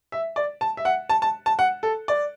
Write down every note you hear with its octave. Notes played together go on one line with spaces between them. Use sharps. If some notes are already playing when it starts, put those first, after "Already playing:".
E5
D5
A5
E5
F#5
A5
A5
A5
F#5
A4
D5